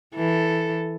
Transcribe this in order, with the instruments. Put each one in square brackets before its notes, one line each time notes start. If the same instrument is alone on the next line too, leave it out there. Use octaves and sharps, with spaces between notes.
[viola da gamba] E3 A4